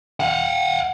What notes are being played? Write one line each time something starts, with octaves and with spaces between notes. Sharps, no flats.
F5 F#5